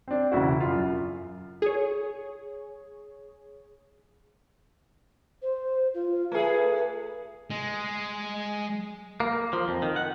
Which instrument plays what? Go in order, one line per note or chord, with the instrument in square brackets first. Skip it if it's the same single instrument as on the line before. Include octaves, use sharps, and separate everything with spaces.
[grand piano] C4 D4
E1 C#3 E4 F#4
F#2 F4
[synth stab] G#4 C#5
[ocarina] C5
F4
[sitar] A3 G#4 [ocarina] B4
[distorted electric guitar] G#3
[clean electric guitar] A#3
F3
F2
D#3
F#5